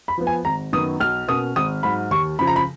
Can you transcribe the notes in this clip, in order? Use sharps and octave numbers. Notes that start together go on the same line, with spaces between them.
B5
F3 B3
G#5
G#1 A#5
F#2 D#3 F#3 B3 D#6
B1 F6
B2 A#3 C#4 D#6
G#1 D#6
G#2 F#3 B5
D#2 C#6
C#3 F3 B5
A#5
B5